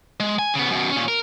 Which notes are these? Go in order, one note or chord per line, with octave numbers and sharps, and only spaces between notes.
G#3
G#5
C#3 B3
F#2 B2
A#2 C#4
A#4